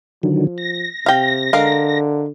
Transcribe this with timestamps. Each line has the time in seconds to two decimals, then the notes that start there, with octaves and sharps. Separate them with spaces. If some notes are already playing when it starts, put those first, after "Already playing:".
0.23 D3 D#3 F3 F#3
0.58 A#6
1.06 C3 F5 G5
1.53 D3 G#3 A#4 F5